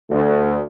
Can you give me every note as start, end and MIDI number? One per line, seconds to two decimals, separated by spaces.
0.10 0.60 38